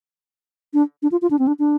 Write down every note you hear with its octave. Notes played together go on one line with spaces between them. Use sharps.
D4
D4
F4
F4
D4
C4
D4
D4